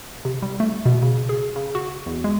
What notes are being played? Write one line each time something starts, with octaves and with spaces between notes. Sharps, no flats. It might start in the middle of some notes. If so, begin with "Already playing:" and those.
C3
G3
A3
B2
C#3
G#4
C#3
F#4
E2
G#3